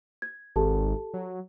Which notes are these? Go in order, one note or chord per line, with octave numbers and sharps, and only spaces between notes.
G#6
G#1 G4 A4 A5
F#3